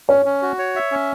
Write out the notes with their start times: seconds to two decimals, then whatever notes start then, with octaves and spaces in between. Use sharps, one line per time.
0.09 C#4 C#5
0.26 C#4
0.42 F#4
0.59 C#5
0.76 E5
0.92 C#4